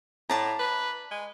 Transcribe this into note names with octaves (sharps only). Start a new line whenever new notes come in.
A2 D5 A5 A#5
B4
G#3